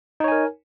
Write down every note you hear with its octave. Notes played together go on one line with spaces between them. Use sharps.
D#4 A#4 C#5 G#5